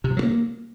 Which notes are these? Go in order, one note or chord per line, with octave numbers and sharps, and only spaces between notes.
C3
F3
F#3
A#3